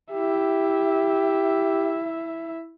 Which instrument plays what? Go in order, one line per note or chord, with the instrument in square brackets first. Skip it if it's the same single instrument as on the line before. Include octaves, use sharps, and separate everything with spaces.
[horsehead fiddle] E4 E5 [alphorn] G4